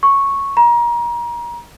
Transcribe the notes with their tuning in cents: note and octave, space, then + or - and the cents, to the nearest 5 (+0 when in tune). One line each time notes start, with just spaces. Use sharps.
C#6 -5
A#5 +30